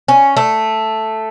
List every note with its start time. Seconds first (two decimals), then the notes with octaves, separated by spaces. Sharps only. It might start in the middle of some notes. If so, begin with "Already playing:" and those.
0.08 C#4
0.37 A3